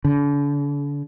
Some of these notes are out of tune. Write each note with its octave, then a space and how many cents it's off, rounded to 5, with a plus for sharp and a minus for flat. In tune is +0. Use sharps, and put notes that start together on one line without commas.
D3 -40